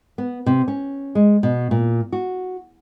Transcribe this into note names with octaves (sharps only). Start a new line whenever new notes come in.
B3
C3
C#4
G#3
B2
A#2
F#4